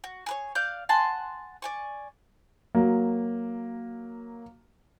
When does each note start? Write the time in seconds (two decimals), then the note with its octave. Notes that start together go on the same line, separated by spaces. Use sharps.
0.04 F#4
0.26 G#4 B4 C#5
0.55 D5 F5 F#6 G6
0.89 F#5 G#5 A5 C6
1.62 D5 G#5 C#6
2.75 F#3 A#3